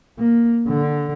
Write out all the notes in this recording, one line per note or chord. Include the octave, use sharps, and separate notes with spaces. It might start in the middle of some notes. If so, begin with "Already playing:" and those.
A#3
D3